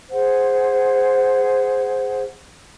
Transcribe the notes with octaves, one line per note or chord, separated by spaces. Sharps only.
G#4 C5 F#5